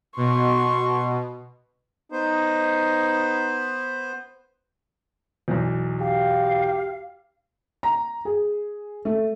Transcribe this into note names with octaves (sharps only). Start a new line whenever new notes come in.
B2 C6 C#6
B3 D#4 C5
B1 E2
G4 F5
A#5
G#4
A3